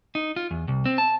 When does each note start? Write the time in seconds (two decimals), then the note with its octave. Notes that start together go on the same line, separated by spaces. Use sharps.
0.15 D#4
0.36 F4
0.51 E2
0.68 C2
0.86 C4
0.98 A5